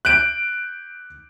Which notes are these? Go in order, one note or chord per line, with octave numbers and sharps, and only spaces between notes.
F#6 G6 D7